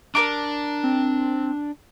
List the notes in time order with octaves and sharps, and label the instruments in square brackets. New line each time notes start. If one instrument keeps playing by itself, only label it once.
[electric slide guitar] D4 [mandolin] A#4 A#5 D6
[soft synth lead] C4